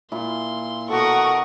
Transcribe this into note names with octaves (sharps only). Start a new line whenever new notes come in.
A#2 E4 F5 C6
B2 F#4 A4 A#4 F#5 C#6 D#6